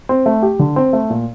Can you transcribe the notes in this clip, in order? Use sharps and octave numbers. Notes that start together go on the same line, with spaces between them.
C4
A3
G4
D3
C4
A3
A#2